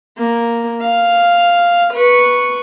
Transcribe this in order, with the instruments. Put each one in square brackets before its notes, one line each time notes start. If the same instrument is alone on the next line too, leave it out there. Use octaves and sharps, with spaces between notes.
[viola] A#3
F5
B4 C#6